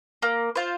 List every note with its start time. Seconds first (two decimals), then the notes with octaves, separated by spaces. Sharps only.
0.22 A#3
0.56 F4 C5